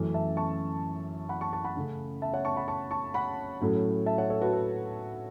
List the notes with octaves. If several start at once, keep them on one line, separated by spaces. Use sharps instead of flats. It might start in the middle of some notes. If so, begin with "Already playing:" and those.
Already playing: F#2 E3 A3 C#4
E5 A5
A5 C#6
F#5 B5
A5 C#6
A5 C#6
F#5 B5
C#3 A3 C#4
E5 A5
C#5 F#5
A5 C#6
F#5 B5
A5 C#6
A5 C#6
F#5 B5
A2 F#3 A3 C#4
E5 A5
C#5 F#5
A4 C#5
F#4 B4
A4